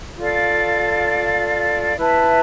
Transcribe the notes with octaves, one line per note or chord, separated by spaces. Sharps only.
F4 A4 D5 F5
E4 B4 E5 A5